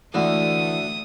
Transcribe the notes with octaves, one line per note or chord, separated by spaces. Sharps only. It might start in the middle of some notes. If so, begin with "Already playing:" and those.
D2 D3 E3 A3 D#6